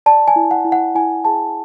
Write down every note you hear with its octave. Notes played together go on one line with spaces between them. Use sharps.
D5 A5
G#5
E4
F#5
E4
F#5
E4 G#5
G#4 A5